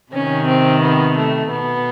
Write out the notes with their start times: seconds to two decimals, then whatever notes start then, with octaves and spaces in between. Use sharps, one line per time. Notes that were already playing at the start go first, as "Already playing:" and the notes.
0.12 C3 D#3 C#4
0.47 C4
0.81 B3
1.15 A3
1.50 B2 B3